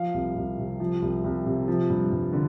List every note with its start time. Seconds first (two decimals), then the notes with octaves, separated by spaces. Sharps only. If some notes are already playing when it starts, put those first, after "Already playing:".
Already playing: F3 F5
0.14 C2
0.36 C2
0.58 C3
0.80 F3
1.02 C2
1.24 C2
1.46 C3
1.68 F3
1.90 G2
2.12 G2
2.33 D3